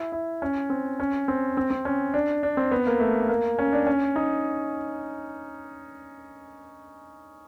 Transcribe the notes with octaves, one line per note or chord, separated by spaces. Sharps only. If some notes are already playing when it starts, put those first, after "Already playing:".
Already playing: E4
E4
C#4
C4
C#4
C4
C4
C4
C#4
D4
D4
C4
B3
A#3
A3
A#3
C#4
D4
C#4
D#4